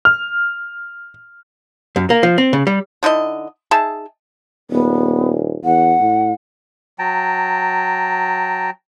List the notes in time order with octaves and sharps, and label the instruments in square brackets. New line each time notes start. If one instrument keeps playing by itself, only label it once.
[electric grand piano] F6
[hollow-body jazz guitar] F#2
A#3
F3
C4
C#3
G3
[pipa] D3 D#4 E4 D#5
D#4 G#4 E5 A5
[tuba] D#1 [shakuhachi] B3
[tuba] E2 [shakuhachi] F#5
[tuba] A2
[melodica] F#3 G5 A5 A#5